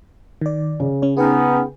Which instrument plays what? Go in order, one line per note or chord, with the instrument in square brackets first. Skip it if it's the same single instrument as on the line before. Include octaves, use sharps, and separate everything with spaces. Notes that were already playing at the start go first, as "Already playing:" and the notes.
[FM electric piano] D#3 D5
[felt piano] C#3
[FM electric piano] C#4 C#5
[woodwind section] B3 C#4 D#4 [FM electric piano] G#4 B4 G5